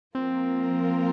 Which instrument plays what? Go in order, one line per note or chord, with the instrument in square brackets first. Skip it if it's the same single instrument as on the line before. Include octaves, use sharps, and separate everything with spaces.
[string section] F3 A#3 F4 A#4 [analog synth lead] C4